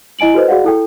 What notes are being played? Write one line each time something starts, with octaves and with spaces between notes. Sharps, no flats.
E4 D#5 G#5 D7 F#7
F#4 A4 B4 C5 D#5
F#4 G#4 D5 F5 F#5
E4 A4 G5